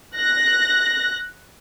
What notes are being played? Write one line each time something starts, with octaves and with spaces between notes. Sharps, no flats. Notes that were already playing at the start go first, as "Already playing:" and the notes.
F#6 A#6